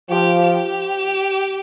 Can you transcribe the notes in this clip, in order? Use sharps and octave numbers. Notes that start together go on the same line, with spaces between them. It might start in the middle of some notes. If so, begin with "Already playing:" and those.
F3 G4
G4